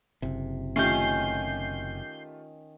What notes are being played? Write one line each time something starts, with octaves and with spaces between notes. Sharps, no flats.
F#1 C3
D#3 A3 C#4 F4 G4 G6 C7